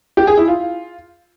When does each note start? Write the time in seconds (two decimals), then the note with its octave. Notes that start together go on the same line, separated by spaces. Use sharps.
0.17 G4
0.27 G#4
0.37 E4
0.48 F4